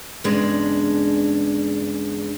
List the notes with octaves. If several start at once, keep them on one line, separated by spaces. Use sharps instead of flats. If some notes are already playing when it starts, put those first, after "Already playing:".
E2 G2 C#3 G#3 D4